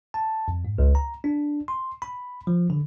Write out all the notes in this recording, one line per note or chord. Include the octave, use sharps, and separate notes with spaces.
A5
F2
G#2
C#2
A#5
D4
C6
B5
F3
D3